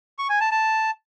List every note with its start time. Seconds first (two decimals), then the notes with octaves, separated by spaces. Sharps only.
0.19 C#6
0.29 G#5
0.40 A5
0.51 A5